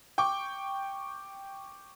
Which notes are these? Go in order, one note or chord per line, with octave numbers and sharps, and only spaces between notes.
G5 C#6 D6